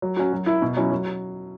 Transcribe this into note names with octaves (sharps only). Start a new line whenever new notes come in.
F#3
C#4 F#4
F#3
E4
B2
F#3 C#4 E4
F#3